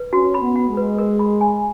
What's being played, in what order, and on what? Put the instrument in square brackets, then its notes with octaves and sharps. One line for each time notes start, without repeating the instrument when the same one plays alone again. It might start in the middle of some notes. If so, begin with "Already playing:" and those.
Already playing: [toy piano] B4
[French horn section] C#4 [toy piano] F#4
[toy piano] B5
[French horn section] B3
[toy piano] F#5
[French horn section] G#3
[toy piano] B4
A#4
B5
G#5